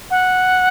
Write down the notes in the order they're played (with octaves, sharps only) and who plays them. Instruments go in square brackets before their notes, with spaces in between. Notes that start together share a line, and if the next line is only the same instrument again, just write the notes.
[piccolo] F#5